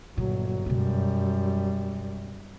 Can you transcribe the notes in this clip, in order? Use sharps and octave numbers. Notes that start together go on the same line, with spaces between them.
G1 A#2 F#3
F#2 B2 G3 G#3